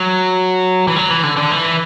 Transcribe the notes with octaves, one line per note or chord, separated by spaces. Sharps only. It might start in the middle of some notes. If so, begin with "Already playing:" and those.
Already playing: F#3
E3
F#3
E3
D3
D3
E3